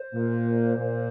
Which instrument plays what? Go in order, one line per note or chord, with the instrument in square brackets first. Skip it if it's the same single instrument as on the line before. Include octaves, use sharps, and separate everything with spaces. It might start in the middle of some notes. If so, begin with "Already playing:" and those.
Already playing: [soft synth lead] C5
[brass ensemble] A#2
A#2